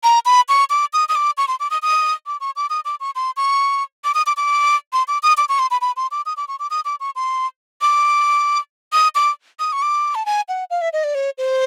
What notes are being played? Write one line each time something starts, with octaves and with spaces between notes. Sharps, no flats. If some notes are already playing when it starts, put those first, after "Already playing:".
A#5
B5
C#6
D6
D#6
D#6
D6
C#6
C6
D6
D#6
D#6
D6
C#6
D6
D#6
D6
C#6
C6
C#6
D6
D#6
D6
D6
C6
D6
D#6
D6
C#6
C6
B5
B5
C6
D6
D#6
D6
C#6
D6
D#6
D6
C#6
C6
D6
D#6
D6
D#6
C#6
D6
A5
G#5
F#5
F5
E5
D#5
D5
C#5
C5